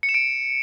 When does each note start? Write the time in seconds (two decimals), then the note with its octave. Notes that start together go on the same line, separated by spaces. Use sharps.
0.03 C#7
0.09 E7
0.14 D7